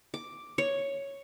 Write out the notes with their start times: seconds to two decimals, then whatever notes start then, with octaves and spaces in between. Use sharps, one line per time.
0.14 D6
0.58 C#5